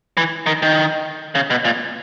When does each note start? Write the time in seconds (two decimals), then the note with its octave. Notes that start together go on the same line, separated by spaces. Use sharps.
0.17 E3
0.46 D#3
0.62 D#3
1.35 C#3
1.50 B2
1.65 A#2